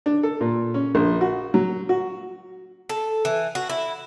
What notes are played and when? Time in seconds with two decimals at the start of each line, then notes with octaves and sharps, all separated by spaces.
0.06 D4
0.23 A4
0.40 A#2
0.74 C#4
0.95 A#1
1.21 F#4
1.54 F#3
1.89 F#4
2.89 A4
3.25 E3
3.55 F#4
3.69 E4